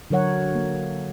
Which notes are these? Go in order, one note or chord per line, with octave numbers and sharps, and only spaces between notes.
D3 F#3 A#4 C#5 F#5
A#3